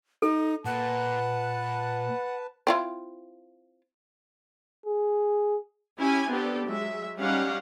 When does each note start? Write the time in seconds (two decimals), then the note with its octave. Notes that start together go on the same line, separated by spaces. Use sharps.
0.22 D#4 A4
0.65 A#2 B4 F#5 A5
2.67 C4 E4 F4
4.86 G#4
5.99 C#4 E4 G4 G#5
6.29 B3 C4 D4 G4 A4
6.67 F#3 G#3 E5
7.19 G3 C#4 D#4 G4 F5 F#5